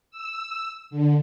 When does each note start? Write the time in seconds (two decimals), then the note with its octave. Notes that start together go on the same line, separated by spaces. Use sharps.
0.11 E6
0.91 D3